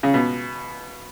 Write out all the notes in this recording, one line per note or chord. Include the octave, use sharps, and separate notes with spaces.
C#3
B2